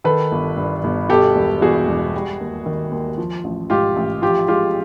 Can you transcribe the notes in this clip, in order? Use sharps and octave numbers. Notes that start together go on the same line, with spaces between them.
D#3 A4 B4
G1
G2
G1
B2 G4 A4
E1
E2 F#4 G#4
E1
G3
D#2
D#3
D#2
F3
A1
G#2 F4 G4
A1
F3 F4 G4
G#3 F4 G4